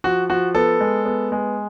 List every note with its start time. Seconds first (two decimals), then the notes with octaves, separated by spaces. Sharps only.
0.04 F3 F#4
0.30 F3 F#4
0.55 B3 A4
0.81 G#3
1.06 B3
1.32 G#3